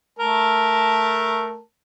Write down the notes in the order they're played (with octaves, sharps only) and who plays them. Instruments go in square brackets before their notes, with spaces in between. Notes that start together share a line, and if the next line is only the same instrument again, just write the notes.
[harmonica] A3 A#4 A5